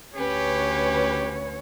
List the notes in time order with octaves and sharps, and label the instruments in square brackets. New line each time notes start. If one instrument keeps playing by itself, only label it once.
[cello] D2 C#5 [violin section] C#4 B4 [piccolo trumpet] G4